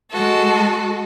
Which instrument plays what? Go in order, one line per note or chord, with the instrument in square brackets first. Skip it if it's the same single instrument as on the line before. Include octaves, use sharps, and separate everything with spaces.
[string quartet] G#3 F#4 A4